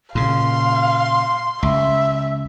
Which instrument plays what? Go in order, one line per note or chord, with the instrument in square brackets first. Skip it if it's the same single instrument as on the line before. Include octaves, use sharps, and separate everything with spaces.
[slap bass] A#2 C#3 [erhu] F5 [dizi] C6
[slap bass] C#2 [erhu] E5